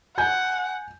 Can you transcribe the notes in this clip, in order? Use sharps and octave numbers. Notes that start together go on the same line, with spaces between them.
F#5 G#5 G6